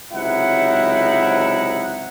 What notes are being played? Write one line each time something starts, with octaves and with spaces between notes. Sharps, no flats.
C#2 C3 F#3 D#4 E4 F#5